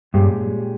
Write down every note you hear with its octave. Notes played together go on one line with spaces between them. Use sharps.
G2 A#2 G#3 C#4 G4